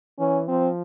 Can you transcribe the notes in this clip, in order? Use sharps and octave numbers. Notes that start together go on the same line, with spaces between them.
E3 C#4
F3 C4